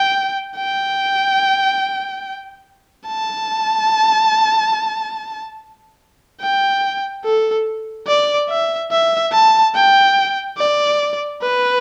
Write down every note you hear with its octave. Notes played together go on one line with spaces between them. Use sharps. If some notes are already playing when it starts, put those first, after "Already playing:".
Already playing: G5
G5
A5
G5
A4
D5
E5
E5
A5
G5
D5
B4